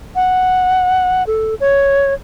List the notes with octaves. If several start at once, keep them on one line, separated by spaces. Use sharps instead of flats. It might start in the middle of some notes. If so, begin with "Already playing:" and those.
F#5
A4
C#5